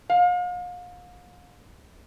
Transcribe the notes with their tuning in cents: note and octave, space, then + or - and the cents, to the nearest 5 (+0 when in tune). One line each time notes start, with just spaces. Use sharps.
F5 +40